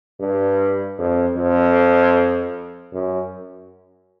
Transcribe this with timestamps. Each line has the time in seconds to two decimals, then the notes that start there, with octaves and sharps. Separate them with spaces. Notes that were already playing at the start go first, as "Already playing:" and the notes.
0.20 G2
0.98 F2
1.37 F2
2.92 F#2